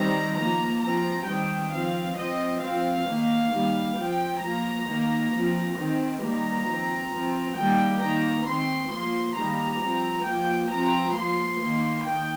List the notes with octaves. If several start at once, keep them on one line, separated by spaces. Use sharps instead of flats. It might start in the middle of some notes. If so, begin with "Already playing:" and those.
Already playing: D#3 G3 C4 A#5
F3 A#3 A#5
F3 C4 A#5
D#3 G3 C4 G5
F3 C4 F5
F3 C4 D#5
F3 C4 F5
D#3 A#3
D#3 G3 A#3
F3 C4 G5
F3 A#3 A#5
D#3 A#3
F3 C4
D#3 C4
D#3 G3 A#3 A#5
F3 C4
F3 C4
D#3 G3 A#3 G5
D#3 A#3 A#5
D#3 C4 C6
F3 A#3 C6
D#3 G3 A#3 A#5
F3 C4
F3 A#3 G5
F3 C4 A#5
F3 A#3 C6
D#3 A#3
D#3 G5